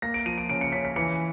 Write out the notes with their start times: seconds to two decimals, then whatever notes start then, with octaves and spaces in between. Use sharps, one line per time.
0.02 A#3 A#6
0.14 D7
0.26 F3 D#7
0.38 D7
0.49 C#3 D7
0.61 C#7
0.72 C#4 B6
0.85 B6
0.96 E3 C#7